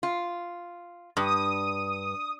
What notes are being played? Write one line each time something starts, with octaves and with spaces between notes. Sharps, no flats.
F4
G2 D#6